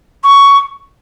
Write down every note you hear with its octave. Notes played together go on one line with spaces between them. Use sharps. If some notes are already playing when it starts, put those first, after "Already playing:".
C#6